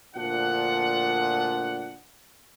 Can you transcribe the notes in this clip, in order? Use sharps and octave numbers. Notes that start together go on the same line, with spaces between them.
D2 A#2 F3 D4 F#5